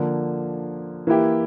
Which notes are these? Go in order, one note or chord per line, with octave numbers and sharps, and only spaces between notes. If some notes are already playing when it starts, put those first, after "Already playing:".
Already playing: D3 F3 A#3
E3 A#3 E4 G4